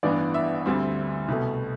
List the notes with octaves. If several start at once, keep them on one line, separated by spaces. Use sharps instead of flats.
A1 G2 E3 B3 D4 D5
E5
D2 D3 G3 C4
C2 B2 A3